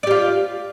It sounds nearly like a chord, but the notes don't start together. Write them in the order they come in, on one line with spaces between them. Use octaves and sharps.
D5 G4 F4